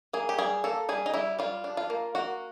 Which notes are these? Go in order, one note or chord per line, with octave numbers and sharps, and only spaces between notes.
A#3 G#4
G4
G3 G#4
A#3 A4
G3 G#4
D#4
G3 E4
G3 F4
D4
F4
A#3
A#3 F#4